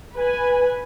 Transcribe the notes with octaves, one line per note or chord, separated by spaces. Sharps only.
B4 G#5